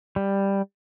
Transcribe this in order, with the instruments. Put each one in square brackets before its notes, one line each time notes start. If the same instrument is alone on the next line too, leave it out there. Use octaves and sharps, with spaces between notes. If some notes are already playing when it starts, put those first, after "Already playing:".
[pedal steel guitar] G3